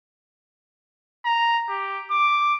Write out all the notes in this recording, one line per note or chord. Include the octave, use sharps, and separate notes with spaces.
A#5
G4
D6